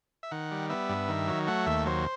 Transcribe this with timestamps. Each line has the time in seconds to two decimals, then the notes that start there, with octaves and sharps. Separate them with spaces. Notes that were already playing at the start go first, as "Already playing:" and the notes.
0.23 E5
0.31 D#3 F#5
0.51 G3
0.70 B3 E5
0.89 G2
1.09 D#3
1.28 F#3
1.47 A3 F#5
1.66 D#2 E5
1.86 F#3 C5